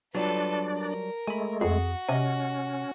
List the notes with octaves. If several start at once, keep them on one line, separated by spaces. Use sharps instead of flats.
F#3 G3 D4 F4 A4 B4 D5
A#4
G#3 A3 G#5 B5
F2 F#4 G#4
C3 C#4 D#5 G#5